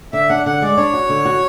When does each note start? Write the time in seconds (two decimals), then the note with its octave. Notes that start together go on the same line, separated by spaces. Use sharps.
0.13 D3 E5
0.29 D4 F#5
0.46 D3 F#5
0.62 G#3 D5
0.77 D4 C#5
0.94 F#4
1.10 D3
1.25 F#4